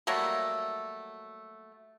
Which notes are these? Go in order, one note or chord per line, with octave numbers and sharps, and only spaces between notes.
F#3 G3 A3 A#3